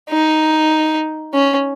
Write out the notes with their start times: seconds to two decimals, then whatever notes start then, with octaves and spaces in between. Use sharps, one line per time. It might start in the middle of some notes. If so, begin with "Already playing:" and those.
0.10 D#4
1.34 C#4